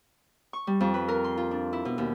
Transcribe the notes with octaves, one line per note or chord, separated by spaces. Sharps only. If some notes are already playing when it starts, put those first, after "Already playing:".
C#6
G3
F2
B4
A#4
C6
F4
D4
E4
B2
D#2